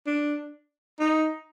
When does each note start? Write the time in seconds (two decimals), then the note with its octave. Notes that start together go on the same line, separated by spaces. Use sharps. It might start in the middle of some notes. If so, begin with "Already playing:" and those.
0.07 D4
1.00 D#4